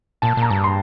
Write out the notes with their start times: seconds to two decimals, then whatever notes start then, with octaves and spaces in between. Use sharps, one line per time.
0.22 A#2 A5
0.37 A#2
0.42 A#5
0.50 G2 A5
0.64 C6